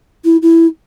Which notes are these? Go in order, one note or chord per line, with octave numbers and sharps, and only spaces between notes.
E4
E4